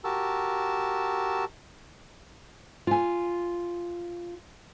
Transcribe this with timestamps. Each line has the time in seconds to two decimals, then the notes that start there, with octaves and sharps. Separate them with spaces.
0.04 F#4 G4 A#4 A5 E6
2.87 F4 G#5